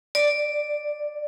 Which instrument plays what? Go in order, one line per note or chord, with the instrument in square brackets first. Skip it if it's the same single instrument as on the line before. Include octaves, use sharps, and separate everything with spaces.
[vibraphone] D5